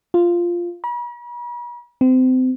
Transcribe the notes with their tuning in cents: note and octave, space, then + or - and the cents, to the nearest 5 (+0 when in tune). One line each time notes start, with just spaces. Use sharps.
F4 -5
B5 -45
C4 -30